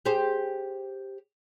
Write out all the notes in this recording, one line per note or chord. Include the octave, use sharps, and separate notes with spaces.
G4 G#4 C5